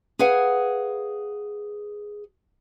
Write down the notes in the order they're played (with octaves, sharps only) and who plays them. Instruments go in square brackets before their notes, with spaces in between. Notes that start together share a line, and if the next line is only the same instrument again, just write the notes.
[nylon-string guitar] G#4 B4 F5 F#5 G#5